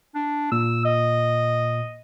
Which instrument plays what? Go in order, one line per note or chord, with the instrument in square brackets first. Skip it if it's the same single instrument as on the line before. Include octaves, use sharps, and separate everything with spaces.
[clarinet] D4
[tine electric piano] A#2 [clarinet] E6
[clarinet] D#5